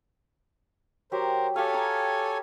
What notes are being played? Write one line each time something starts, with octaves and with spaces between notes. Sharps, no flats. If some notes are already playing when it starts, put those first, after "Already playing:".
F#3 G4 A#4 C5
G4 A4 C#5 F5 G#5
A#5 D6